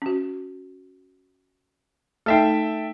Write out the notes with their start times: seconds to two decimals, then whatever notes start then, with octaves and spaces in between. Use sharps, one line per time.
0.02 C#4 F#4
2.26 A3 D#4 A4 E5 G5